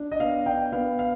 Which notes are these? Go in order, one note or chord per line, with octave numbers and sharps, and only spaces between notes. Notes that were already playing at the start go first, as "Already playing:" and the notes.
Already playing: D4
D#5
B3 F5
D4 G5
B3 F5
F5